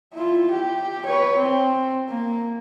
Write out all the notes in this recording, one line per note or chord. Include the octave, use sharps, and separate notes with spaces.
E4 F4
G4
B4 C#5
C4
A#3